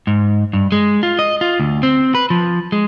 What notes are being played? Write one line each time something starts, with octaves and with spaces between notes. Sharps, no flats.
G#2
G2
G#3
F4
D#5
F4
D2
C4
B4
F3
G#3